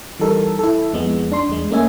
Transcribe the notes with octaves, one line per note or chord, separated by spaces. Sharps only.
E3 G3 D#4 A4 A#4
E4 A4
F2 G#3 B3
D4 C6
E2 G#3
A3 A#3 C#4 D#5 E5 G#5